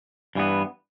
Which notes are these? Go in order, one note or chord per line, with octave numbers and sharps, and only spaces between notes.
G2 E3 B3